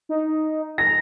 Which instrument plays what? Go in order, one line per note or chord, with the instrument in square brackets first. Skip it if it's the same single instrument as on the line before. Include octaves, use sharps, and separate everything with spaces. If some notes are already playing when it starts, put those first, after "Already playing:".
[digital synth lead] D#4
[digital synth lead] A#5 [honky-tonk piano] A#6